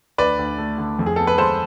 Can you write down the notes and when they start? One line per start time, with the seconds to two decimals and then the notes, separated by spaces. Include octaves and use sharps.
0.18 D2 B4 D5
0.39 D2
0.58 A3
0.78 D3
0.99 F2
1.06 G#4
1.16 B3 A4
1.27 B4
1.38 G#3 A4 C5